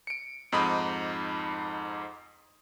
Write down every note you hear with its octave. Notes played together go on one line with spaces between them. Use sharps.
C#7 D7
F2 G#2 D#4 B5 D#6